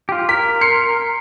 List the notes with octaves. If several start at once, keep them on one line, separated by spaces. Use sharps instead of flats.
F4 G4
A#4 B6
C6 C7 C#7